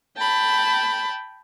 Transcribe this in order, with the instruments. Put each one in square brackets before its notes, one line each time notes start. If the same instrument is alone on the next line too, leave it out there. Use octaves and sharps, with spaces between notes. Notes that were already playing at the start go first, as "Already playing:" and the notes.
[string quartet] G5 A5 B5